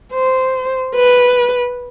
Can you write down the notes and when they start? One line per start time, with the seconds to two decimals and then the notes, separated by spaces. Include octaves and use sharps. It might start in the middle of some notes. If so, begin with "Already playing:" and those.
0.13 C5
0.95 B4